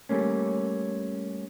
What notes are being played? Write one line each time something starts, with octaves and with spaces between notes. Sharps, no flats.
G3 A3 A#3 C#4